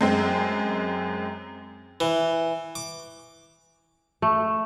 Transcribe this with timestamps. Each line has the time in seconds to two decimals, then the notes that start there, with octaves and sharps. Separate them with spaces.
0.01 F#2 G#3 C4
2.00 E3
2.75 D6
4.22 A3